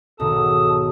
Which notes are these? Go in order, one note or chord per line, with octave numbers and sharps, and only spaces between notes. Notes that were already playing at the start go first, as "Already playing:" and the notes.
B1 G#2 D#3 A4 A5 D#6